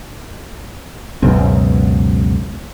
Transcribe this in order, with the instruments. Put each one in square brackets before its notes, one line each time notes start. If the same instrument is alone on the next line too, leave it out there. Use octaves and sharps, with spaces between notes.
[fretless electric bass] C#2 F#2 B2 C4